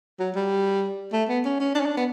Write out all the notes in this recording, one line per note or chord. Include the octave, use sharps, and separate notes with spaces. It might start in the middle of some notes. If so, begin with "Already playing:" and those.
F#3
G3
A3
B3
C#4
C#4
D4
C#4
D4
B3